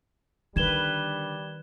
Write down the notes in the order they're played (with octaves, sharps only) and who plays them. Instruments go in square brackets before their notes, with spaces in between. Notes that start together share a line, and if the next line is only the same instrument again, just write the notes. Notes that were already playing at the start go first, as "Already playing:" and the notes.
[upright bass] D3 D4 [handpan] D#3 B4 [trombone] G3 [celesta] G#6 E7 G7